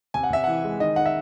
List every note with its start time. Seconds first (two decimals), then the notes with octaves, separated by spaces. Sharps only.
0.14 C3 G#5
0.23 F#5
0.30 C3 E5
0.44 E3 F#5
0.64 G#3
0.80 D#3 D#5
0.96 D#3 F#5
1.06 E5